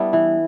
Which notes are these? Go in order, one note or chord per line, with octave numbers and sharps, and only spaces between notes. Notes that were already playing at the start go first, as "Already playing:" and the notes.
Already playing: G3 B3 D4 E4
E3